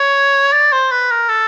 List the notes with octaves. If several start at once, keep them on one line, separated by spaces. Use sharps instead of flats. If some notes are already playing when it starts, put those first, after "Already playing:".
Already playing: C#5
D5
C5
B4
A#4
A4